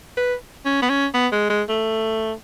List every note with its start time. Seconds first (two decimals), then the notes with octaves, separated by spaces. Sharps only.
0.17 B4
0.65 C#4
0.82 B3
0.89 C#4
1.14 B3
1.32 G#3
1.50 G#3
1.69 A3